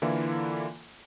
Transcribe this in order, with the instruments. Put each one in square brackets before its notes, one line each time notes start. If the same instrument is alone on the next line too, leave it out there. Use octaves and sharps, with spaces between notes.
[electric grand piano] D3 E3 A#3 E4 F4 A4